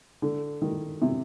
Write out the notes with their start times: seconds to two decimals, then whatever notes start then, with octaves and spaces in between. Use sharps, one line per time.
0.22 D3
0.62 D#3
1.02 C3